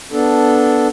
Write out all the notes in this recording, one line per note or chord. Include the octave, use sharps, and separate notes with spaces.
B3 D4 A4